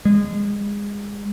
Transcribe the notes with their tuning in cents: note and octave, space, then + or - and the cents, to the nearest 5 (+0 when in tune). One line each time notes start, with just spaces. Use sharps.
G#3 -25